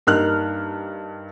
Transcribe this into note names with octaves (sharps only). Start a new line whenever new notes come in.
G2 A#3 D#4 F6 F#6